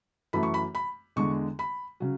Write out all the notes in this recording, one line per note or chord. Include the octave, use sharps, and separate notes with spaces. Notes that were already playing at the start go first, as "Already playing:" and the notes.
F#2 E3 A3 B5
C#6
B5
B5
E2 D3 G#3 C#6
B5
C#3 F#3